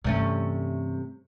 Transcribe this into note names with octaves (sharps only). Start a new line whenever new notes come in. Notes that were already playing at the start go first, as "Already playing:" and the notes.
G2 C3 E3 A3 C#4